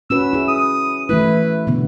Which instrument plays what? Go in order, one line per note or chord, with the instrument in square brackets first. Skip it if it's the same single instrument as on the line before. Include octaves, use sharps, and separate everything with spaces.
[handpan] C#4 F#4 B4 [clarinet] E6
[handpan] E4 G#4
[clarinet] D#6
[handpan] E3 A3 E4 [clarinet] B4
[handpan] B2 D3 B3